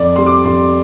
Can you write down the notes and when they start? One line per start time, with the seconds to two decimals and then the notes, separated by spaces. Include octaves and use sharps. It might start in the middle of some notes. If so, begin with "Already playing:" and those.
Already playing: F2 D5
0.16 C3 G3 C6
0.26 D6
0.45 F2 C6